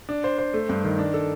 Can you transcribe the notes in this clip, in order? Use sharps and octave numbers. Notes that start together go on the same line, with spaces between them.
D4
C5
C5
A3
G2
D#3
D4
A4